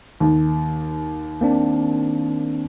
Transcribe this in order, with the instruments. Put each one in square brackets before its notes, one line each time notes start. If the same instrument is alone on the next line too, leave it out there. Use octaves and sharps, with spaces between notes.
[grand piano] D#2
[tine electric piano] A#3 C4 D4